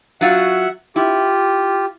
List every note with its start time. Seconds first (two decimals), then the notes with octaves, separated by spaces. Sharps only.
0.21 F#3 F4 F#4 E5 F#5
0.96 E4 F4 G4